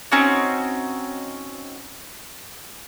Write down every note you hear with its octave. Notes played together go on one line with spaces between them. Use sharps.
C4 C#4 D#4 F#4